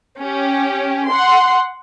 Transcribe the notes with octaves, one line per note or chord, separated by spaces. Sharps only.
C#4 G4
F#5 C6